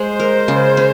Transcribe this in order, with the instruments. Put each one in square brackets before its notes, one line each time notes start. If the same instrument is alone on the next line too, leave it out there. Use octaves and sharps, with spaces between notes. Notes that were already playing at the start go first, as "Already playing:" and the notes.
Already playing: [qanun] G#3 [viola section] C5
[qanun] A#4
C#3
C#4